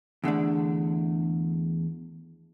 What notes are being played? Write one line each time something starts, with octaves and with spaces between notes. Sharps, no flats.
E2 D3 A3 D4